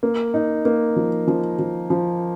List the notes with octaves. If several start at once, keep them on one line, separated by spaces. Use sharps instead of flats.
A#3
D#4
A#3
F3
F3
F3
F3